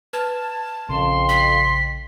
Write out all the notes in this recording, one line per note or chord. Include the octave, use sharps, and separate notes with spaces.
B4 A5 F6 G#6
A#1 F2 C#3 C6
B6